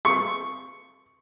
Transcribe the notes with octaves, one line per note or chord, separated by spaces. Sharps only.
C#6